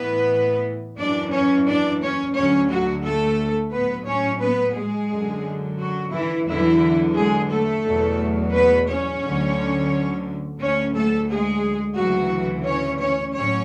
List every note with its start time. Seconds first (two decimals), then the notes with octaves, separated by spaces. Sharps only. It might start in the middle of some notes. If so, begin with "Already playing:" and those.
Already playing: A2 E3 B3 B4
0.98 F#2 E3 D4 D5
1.32 C#4 C#5
1.67 D4 D5
2.01 C#4 C#5
2.35 D2 D3 F#3 C#4 C#5
2.70 F#3 F#4
3.04 A3 A4
3.72 A2 F#3 B3 B4
4.07 C#4 C#5
4.41 B3 B4
4.75 G#3 G#4
5.11 F#2 D3 F#3
5.79 F#3 F#4
6.13 E3 E4
6.47 E2 D3 E3 F#3 E4
7.16 G#3 G#4
7.49 A3 A4
7.85 E2 B2 F#3
8.53 B3 B4
8.87 C#4 C#5
9.22 D2 D3 F#3
10.58 D2 D3 F#3 C#4 C#5
10.93 A3 A4
11.27 G#3 G#4
11.96 D2 C#3 E3 F#3 F#4
12.65 C#4 C#5
12.99 C#4 C#5
13.33 A2 F#3 C#4 C#5